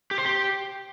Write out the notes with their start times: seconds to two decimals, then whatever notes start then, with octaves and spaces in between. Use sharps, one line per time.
0.11 G4
0.18 C5
0.25 G4